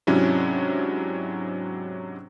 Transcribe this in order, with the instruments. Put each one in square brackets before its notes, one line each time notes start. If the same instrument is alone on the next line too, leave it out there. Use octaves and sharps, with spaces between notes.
[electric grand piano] G#2 C3 F#3 C#4 D4 E4